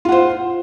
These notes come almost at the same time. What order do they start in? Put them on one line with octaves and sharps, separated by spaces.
F4 F#5 C5